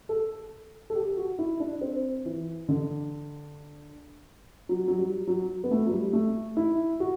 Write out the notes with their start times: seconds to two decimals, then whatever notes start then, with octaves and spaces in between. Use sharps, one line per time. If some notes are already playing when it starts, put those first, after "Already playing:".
0.09 A4
0.90 A4
0.95 G4
1.17 F#4
1.39 E4
1.60 D4
1.81 C4
2.25 E3
2.69 D3
4.69 F#3
4.88 F#3
4.99 G3
5.27 F#3
5.64 B3
5.71 A3
5.87 F#3
5.92 G3
6.13 A3
6.57 E4
7.00 F#4